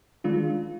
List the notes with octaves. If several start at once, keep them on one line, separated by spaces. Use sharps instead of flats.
D#3 G#3 D4 F4